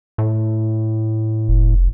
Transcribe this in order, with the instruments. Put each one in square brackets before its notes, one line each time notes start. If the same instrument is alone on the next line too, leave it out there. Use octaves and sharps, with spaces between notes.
[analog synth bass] A2
[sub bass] F1